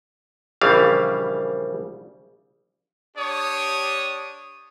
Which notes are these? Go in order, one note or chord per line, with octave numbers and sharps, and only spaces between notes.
A#1 C#3 E3 G3 F5
D4 G4 C#5 D#6